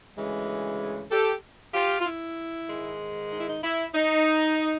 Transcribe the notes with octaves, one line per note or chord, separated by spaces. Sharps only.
D2 C#3 E3 G#3
G4 A4
F4 G4
F4
E4
G#2 D#3 G#3
D#4
E4
D#4
E4
D#4